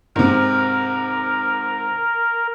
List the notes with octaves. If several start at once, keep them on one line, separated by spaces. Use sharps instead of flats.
G#2 C3 A#4